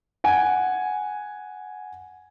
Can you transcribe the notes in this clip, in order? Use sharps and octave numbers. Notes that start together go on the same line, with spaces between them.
F#5 G#5